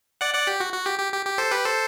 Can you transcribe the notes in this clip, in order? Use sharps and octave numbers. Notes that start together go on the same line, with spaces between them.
D5 F#5
D5 F#5
G4
F#4
F#4
G4
G4
G4
G4
A4 C5
G4 B4
A4 C5